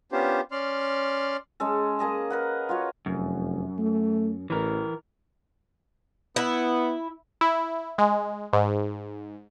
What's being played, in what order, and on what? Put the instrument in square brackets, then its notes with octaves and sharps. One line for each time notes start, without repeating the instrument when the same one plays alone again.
[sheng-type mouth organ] B3 C#4 D4 F4 G4 C5
C#4 D5 C6 F6
[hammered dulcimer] G#3 C#4 A4
A#3 G#4 D#5 A5
A#4 B4 F#5
F4 F#4 C#5
[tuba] F1 [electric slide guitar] F#2
[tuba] A3
[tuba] A1 [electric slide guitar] E3 A#4
[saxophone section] B3 [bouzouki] E4
[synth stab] E4
G#3
G#2